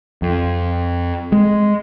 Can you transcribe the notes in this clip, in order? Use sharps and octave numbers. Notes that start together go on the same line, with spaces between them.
F2
G#3